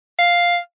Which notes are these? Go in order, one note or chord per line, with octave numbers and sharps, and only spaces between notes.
F5